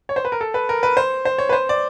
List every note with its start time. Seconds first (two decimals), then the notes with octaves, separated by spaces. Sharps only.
0.09 C#5
0.16 C5
0.25 B4
0.32 A#4
0.41 A4
0.54 B4
0.69 A#4
0.83 B4
0.97 C5
1.25 C5
1.38 C#5
1.49 B4
1.53 C5
1.69 D5